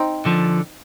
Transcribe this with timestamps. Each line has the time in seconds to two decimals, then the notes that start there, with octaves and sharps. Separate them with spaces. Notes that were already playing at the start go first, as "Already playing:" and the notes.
Already playing: C4 D#4
0.26 D3 F3